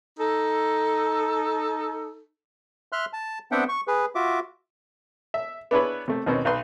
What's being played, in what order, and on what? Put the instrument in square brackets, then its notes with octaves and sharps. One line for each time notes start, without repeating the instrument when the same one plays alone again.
[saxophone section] D#4 A4
[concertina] E5 C6 F6 F#6
A5
B3 C4 D4 E5 F#5 G5
C#6
G#4 B4
F4 F#4 E5 D6
[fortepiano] E5
B3 D4 E4 G#4 B4 C#5
C3 A3
D#2 B2 C4 C#4
B1 B4 C6